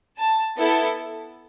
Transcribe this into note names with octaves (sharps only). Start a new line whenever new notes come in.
A5
B3 E4 A4